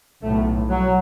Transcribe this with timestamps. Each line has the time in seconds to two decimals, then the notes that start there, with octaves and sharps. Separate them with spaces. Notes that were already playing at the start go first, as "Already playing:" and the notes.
0.23 B1 A2 A3
0.70 F#3